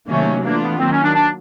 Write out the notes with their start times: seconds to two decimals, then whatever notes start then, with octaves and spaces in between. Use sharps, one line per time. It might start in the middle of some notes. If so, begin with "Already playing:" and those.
0.08 C3 D#3 F#3 A3 A#3 C#4
0.43 E3 A3 A#3 D4 F4
0.62 B3
0.78 D#3 F#3 A#3 C4
0.91 C#4
1.03 D4
1.14 D4